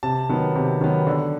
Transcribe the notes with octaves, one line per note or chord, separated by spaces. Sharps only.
C3 A5
D#3 F#3 B3
C3
D#3 F#3 B3
D3